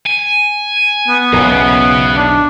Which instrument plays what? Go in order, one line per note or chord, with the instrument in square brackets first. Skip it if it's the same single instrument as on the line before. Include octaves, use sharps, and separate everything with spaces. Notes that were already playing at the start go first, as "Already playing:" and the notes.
[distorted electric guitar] G#5
[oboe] B3
[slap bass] B1 E2 G#2 [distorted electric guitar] C#3
[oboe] B3
D4